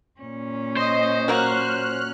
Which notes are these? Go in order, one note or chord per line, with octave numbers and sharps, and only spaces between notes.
A#2 C#4
C5 D#5
F#3 A#3 F#4 F6 F#6